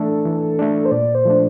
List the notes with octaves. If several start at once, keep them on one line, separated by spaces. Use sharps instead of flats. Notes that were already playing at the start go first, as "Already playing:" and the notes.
Already playing: E3 A3 D4 A4
E3
A3 D4
C5
A#2 D5
C5
F3 A3 D4